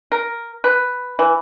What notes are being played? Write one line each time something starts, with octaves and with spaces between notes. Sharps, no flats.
A#4
B4
E3